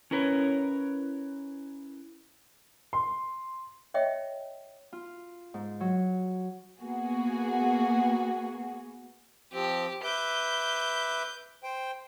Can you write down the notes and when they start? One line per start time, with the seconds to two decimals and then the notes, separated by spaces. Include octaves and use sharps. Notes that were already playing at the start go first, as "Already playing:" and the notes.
0.11 C#4 E4 A#4 B4 C#5
2.93 C6
3.94 C#5 D#5 E5 G5
4.93 F4
5.54 G#2
5.80 F#3
6.81 A#3 B3 F#4 G#4
9.53 F3 C4 G4
10.04 B4 E5 D6 G6
11.63 C5 G5